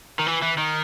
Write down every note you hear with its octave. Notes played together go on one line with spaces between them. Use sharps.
D#3
E3
E3
D#3